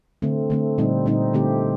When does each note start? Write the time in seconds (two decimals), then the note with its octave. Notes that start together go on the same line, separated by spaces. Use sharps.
0.22 D3 A3 C4
0.50 D3 A3 C4
0.78 A#2 G3 C4 D#4
1.06 A#2 G3 C4 D#4
1.34 D3 A3 C4 G4